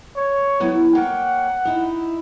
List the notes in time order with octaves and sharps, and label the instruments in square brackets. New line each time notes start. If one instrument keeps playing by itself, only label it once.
[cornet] C#5
[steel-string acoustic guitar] F#3 B3 E4
[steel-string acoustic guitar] A#3 C#5 G5 [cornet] F#5
[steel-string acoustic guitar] D#4 E4